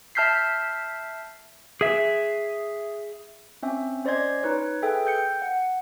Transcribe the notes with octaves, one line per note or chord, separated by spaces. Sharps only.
E5 A5 F6 G6 B6 C7
G#4 E5
C4 C#4 E5
C#4 C5 D5 D#5 C6 G#6
D#4 B4 C#5
G#4 A4 B4 E5 G5
G5 G6 C#7
F#5